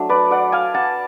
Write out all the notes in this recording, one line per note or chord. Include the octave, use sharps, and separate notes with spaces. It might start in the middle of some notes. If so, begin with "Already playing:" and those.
Already playing: F#3 A3 D4
B4 D5
D5 F#5
F5 G#5
F#5 A5